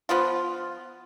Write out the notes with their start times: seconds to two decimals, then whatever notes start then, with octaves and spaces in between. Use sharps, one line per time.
0.09 F3 B3 F4